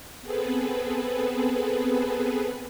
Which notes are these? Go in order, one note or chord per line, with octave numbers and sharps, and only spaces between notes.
B3 C4 G#4 A4 B4